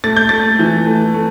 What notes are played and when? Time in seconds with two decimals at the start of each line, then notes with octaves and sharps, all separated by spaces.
0.04 A3 A6
0.16 G6
0.29 A3 A6
0.59 E3
0.87 A3
1.14 A3